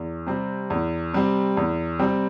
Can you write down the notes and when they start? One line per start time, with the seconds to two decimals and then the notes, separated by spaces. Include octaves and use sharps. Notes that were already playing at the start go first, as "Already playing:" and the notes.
Already playing: E2
0.26 C3 G3 C4
0.70 E2
1.13 C3 G3 C4
1.57 E2
1.99 C3 G3 C4